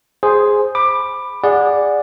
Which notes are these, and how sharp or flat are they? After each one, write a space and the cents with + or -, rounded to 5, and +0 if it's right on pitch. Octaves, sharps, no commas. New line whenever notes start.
G#4 +0 C5 +0
B5 +0 D6 +20
G#4 -20 D5 +0 F#5 -20